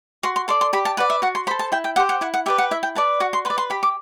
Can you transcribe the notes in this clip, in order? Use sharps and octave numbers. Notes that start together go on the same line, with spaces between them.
F#4 C6
C6
A4 D5 C6
C6
G4 B5
A5
B4 D5 F#5
E5
F#4 F#5
C6
A4 C5 B5
A5
E4 G5
G5
G4 C5 F#5
F#5
E4 F#5
F#5
G4 B4 D5 E5
F#5
E4 E5
G5
B4 D5 A5
F#4 F#5
C6
B4 C6
D5
C6
G4 B5
D6